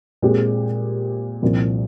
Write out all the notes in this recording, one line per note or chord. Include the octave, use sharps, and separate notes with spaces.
A#2 G#3 C4 G4
C2 A#2 F3